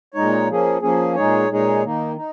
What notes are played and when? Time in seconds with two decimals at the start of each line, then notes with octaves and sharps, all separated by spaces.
0.14 A#2 G#3 D#4 C#5
0.48 F3 A#3 C#4 G#4
0.82 F3 A#3 C#4 G#4
1.15 A#2 G#3 D#4 G#4 C#5
1.49 A#2 G#3 D#4 G#4 C#5
1.84 D#3 A#3 D#4
2.16 D#4